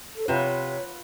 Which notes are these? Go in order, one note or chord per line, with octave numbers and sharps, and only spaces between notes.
A4
C3 F4 B4 C#5 F#5